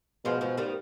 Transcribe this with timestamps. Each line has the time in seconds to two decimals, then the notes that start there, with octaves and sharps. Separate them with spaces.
0.25 B2 F3 G#3
0.41 F3 G#3
0.57 D#3 G3